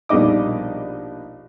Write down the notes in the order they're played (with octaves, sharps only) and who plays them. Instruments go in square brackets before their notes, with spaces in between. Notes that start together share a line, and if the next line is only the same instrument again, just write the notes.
[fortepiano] A#1 B2 G3 D#4 D#5 D6